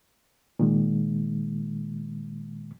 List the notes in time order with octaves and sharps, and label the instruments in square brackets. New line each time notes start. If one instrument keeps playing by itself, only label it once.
[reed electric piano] A#2 D#3 G#3